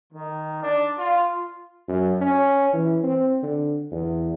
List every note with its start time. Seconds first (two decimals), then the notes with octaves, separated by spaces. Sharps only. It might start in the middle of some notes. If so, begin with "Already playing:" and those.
0.13 D#3
0.63 D4
0.99 F4
1.88 F#2
2.21 C#4
2.73 E3
3.03 C4
3.43 D3
3.91 E2